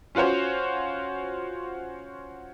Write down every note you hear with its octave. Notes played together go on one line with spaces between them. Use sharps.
C#4 F4 F#4 C5 C#5